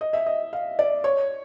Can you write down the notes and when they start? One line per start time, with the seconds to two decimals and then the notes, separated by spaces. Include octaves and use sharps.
0.01 D#5
0.13 E5
0.26 D#5
0.53 F5
0.79 D5
1.04 C#5